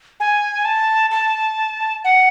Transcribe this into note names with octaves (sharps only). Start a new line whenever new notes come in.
G#5
A5
A5
F#5